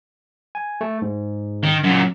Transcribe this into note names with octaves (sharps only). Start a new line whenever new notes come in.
G#5
A3
G#2
D#3
F#2 A#2